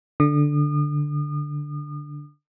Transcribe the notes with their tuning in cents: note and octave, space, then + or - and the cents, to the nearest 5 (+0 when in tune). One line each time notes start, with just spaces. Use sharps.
D3 +0 D#6 -40